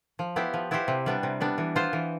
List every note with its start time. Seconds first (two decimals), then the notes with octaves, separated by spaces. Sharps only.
0.19 F3
0.36 B3 E4 G4 C5
0.54 F3
0.71 B3 E4 G4 C5
0.88 C3
1.06 G3 B3 D4
1.23 C3
1.40 G3 B3 D4
1.58 E3
1.76 B3 F4 C5
1.93 E3